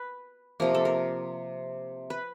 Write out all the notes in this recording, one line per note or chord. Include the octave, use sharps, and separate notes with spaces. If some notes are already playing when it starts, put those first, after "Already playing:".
Already playing: B4
C3 F3 A#3 A#4
A4
A#4
B4